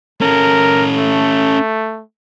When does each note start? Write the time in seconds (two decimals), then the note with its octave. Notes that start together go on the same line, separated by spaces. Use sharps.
0.21 C#4 A4 A#4
0.97 A3